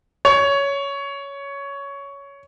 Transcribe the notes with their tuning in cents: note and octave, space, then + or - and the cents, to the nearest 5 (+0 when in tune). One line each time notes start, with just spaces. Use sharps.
C#5 +10